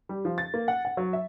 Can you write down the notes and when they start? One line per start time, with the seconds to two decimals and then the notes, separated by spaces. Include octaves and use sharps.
0.09 G3
0.25 F3
0.38 A6
0.54 A#3
0.68 F#5
0.85 F#5
0.97 F#3
1.13 E5